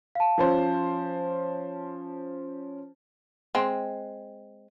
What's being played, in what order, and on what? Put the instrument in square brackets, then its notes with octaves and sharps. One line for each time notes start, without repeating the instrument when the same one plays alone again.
[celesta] F5 A5
[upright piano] F3 C#4 C5
[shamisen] G#3 C4